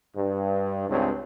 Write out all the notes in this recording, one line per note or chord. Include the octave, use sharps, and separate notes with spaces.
G2
C#2 G2 C4 C#4